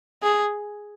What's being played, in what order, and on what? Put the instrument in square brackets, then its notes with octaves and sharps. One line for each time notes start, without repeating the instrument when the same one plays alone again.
[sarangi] G#4